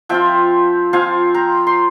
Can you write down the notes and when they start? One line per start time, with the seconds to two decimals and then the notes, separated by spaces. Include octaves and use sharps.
0.09 F3 C4 F4 E5 G5
0.93 F3 C4 F4 F5 G#5
1.34 G5 A#5
1.67 C6